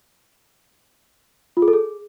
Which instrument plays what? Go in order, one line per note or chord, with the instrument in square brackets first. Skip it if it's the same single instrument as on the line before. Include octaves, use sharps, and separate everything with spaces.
[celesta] F4
G#4
A4
G#4